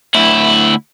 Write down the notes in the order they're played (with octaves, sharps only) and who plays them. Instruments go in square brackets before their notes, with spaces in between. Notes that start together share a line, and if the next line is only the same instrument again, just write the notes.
[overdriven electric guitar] D2 E4